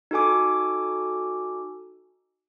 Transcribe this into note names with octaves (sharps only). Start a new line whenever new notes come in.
D#4 F#4 A4 G#5 D6